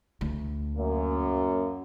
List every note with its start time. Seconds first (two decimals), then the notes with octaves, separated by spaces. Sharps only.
0.21 D2
0.76 F#2 A#3